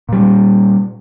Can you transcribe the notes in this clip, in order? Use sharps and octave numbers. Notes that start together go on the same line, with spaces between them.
A#2 G3